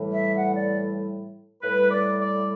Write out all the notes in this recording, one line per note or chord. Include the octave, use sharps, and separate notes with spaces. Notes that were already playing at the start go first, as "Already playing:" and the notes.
Already playing: A2 E3 G3
E5
F#5
D5
A2 G3 B4
D5
D5